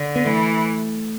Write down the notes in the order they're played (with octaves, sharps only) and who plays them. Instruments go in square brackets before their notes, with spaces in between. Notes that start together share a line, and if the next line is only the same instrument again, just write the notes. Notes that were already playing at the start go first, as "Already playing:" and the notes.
Already playing: [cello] D3
[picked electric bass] B3
[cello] E3 [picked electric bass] A3